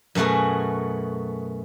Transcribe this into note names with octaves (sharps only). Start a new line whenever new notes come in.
F#2 B2 A3 F#4 G#4